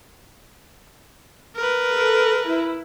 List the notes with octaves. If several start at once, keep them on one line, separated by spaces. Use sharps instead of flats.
A#4 B4
A4
E4